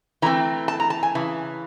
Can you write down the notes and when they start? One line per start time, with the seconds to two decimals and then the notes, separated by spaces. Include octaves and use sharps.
0.22 E3 A3 C4 A#5
0.68 A5
0.80 A#5
0.90 A5
1.03 G#5
1.15 C#3 E3